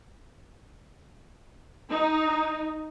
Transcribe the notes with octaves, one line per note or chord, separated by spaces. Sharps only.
D#4